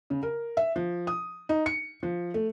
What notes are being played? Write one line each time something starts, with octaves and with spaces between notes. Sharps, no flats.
C#3
A#4
E5
F3
D#6
D#4
C#7
F3
A3